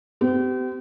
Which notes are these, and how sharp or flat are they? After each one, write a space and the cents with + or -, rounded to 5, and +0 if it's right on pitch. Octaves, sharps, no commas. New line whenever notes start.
C4 -45 G4 -25